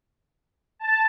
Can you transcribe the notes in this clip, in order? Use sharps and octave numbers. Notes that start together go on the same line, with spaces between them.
A5